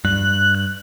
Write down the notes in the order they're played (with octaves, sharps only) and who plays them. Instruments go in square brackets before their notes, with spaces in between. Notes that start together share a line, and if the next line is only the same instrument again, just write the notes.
[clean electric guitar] G2 [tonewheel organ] F#6